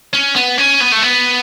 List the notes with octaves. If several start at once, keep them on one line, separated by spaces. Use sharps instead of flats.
C#4
B3
C#4
B3
A3
B3